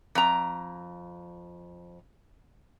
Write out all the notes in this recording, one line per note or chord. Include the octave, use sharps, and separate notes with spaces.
F2 A#5